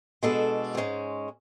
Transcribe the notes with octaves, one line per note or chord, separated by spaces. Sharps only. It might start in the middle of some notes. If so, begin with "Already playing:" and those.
B2 G#3 D4 A4
G#2 G#3 C#4